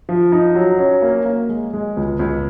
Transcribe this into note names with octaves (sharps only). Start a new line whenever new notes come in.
F3
D#4
F#3
C#4
A#3
A#3
G#3
G#3
C#2
C#2